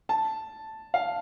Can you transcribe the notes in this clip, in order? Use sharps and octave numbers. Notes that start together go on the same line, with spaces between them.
A5
F5